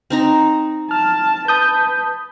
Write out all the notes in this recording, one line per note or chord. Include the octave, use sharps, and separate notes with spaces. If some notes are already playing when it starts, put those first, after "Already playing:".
C4 D#4 A#5
A5 F6
B4 A5 D#6 G6